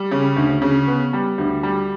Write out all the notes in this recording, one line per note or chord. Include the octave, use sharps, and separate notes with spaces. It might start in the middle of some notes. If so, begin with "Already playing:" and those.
Already playing: G3
C#3
D2
C#3
B3
G3
D2
G3